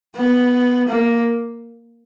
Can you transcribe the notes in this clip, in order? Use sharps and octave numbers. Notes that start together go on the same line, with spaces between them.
B3
A#3